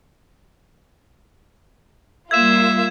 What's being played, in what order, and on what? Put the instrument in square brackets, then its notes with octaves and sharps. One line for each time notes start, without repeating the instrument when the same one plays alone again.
[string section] G3 A#3 F4 [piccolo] E5 [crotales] G#6 E7